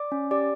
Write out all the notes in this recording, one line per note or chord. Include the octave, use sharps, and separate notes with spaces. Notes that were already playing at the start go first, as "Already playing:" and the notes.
Already playing: D5 D6
C#4
G4 D5 D6